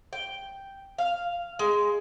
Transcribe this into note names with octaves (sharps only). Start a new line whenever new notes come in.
G5
F5
G#3